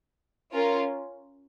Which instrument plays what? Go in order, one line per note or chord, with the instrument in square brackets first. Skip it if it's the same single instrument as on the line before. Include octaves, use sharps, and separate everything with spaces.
[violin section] C#4 F4 A#4